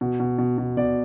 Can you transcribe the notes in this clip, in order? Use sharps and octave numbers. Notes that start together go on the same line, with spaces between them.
B2
B2
B2
B2
B2 D5